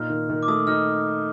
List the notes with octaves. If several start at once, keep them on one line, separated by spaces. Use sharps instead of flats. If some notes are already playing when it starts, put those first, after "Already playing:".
Already playing: A#2 D#4 F6
D#3
D#3
D6
A3 D#6
D#4 F6